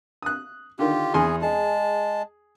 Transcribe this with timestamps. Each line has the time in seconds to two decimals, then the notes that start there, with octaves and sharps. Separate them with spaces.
0.22 D#6 F#6
0.79 D3 D#3 F4 G4
1.14 E2 G#4 G#5 C6
1.42 G#3 G#4 A5